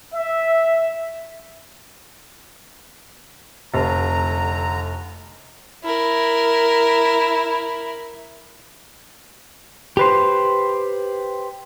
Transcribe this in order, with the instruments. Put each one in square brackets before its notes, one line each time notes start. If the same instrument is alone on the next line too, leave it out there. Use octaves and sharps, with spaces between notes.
[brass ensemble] E5
[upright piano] F1 [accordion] D3 A#5
[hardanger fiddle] E4 A#4
[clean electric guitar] G4 B4 C5